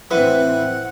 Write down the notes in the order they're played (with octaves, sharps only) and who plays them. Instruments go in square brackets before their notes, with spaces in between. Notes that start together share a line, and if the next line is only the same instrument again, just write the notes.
[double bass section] A2 C4 [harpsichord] E3 [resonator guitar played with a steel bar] B4 [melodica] F#5